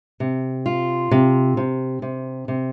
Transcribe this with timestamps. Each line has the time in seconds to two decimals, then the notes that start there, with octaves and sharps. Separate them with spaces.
0.20 C3
0.66 F4
1.11 C3
1.57 C3
2.02 C3
2.48 C3